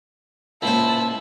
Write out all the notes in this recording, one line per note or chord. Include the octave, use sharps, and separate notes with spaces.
C#2 A#2 E4 C5 A5